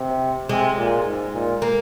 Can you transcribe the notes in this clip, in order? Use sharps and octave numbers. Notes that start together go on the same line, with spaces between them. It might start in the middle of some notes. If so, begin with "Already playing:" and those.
Already playing: C3
C3 G#3
A#2
G#2
A#2
A#3